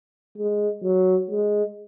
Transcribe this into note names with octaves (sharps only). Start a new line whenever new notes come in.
G#3
F#3
G#3